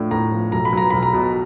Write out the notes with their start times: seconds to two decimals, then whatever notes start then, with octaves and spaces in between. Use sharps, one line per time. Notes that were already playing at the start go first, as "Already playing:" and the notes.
Already playing: A2 F3 A3 D4
0.11 A2 A#5
0.31 F3
0.52 B1 A#5
0.65 B5
0.73 F#3 A#5
0.90 B1 B5
1.03 A#5
1.14 B2